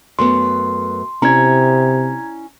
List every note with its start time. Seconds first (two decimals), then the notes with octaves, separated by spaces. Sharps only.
0.19 F#2 A3 B3 C6
1.22 C3 C#4 E4 D5 A#5 G#6